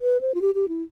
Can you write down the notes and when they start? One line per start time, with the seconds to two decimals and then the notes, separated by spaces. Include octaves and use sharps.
0.01 B4
0.21 C5
0.34 F4
0.42 G4
0.55 G4
0.68 E4